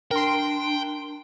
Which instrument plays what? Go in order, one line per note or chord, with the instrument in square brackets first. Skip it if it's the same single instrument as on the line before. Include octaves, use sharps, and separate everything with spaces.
[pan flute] D4 [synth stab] A#4 C6 [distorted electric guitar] G5